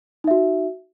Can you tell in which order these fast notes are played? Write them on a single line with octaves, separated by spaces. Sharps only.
D#4 E5 F#4